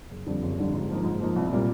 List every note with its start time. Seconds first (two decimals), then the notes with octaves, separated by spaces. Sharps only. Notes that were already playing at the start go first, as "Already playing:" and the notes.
0.11 F#1
0.26 F2 D3 G3
0.42 F#1
0.58 F2 D3 G3
0.74 G#2
0.89 F3 A#3 D#4
1.05 G#2
1.20 F3 A#3 D#4
1.36 C2
1.51 A#2 G3 A#3